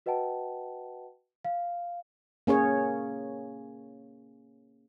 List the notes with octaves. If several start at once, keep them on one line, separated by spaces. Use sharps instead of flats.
F#4 B4 D#5 F#5 G5 A5
F5
A#3 C#4 G#4 C#5